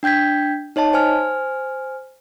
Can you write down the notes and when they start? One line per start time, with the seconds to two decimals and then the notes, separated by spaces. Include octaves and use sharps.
0.03 D4 G5 G6 G#6 B6
0.76 D#4 C#5 D#5 A5
0.93 C5 G#5 F6